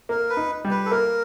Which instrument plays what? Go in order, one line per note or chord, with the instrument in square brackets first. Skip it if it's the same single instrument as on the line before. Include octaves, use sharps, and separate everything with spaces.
[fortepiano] A#3 [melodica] A#4
[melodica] B4
[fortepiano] D#4
G3
[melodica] B4
A4
[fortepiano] A#3 [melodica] A#4